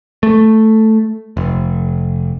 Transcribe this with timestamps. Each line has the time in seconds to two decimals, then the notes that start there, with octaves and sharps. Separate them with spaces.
0.23 A3
1.37 F1